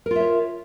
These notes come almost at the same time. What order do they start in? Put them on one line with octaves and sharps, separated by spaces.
A#4 F4 E5 C#5